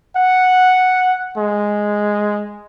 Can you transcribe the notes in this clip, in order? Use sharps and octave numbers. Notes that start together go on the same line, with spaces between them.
F#5
G#3